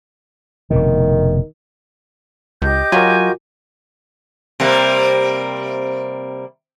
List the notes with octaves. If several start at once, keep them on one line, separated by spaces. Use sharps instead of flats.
F1 B2 D3 D#3
C#2 G4 D#5 G6
F#3 F4 F#4 A#4 G#5
C3 G3 A#3